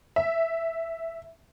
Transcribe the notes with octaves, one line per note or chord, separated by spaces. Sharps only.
E5